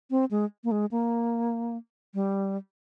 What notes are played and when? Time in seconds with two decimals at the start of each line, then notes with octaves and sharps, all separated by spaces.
0.11 C4
0.31 G#3
0.64 A#3
0.71 G#3
0.91 A#3
2.14 G3